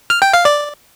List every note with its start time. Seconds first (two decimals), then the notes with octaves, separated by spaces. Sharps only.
0.10 F6
0.22 G5
0.33 F5
0.45 D5